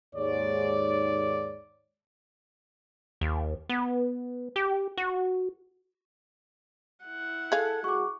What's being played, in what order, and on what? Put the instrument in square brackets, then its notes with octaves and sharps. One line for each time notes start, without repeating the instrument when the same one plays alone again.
[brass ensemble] D#2 G#2 C#5 D5
[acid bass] D#2
B3
G4
F#4
[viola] E4 F#5
[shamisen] G#4 F5 [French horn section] A4 [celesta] G#6
[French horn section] G#3 F#4 [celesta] C#6 D6